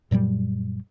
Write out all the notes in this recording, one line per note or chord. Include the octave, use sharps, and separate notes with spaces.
F#2 A#2 F#3 G3